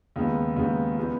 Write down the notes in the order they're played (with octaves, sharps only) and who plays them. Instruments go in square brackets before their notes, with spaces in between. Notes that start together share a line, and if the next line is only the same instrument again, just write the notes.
[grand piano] D#2 C#3 G#3 B3
D#2 C#3 G#3 B3
C#3 F3 G#3 B3